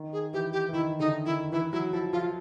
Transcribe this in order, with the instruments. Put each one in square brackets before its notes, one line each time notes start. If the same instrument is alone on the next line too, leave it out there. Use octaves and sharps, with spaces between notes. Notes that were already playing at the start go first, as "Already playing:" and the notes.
Already playing: [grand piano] D#3
[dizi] G#4
[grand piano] E3 [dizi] G4
[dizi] G4
[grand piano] E3
[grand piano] D#3 [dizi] E4
[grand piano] D3 [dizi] D#4
[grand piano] D#3 [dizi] E4
[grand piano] E3 [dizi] E4
[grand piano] F#3 [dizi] E4
[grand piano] F3 [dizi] E4
[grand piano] F3 [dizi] F4